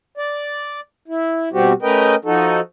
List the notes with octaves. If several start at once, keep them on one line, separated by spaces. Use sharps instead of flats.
D5
E4
B2 G3 C4 F#4 G4
A3 C#4 A#4 B4 D#5 G5
F3 D#4 F#4 A4